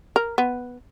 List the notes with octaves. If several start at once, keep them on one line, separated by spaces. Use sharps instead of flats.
A#4
B3